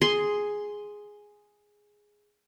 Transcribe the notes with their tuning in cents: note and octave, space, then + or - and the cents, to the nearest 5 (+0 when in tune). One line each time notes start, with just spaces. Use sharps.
G#4 +0 C6 +0